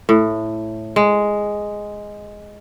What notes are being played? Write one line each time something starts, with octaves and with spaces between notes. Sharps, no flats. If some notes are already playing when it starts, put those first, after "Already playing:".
A2
G#3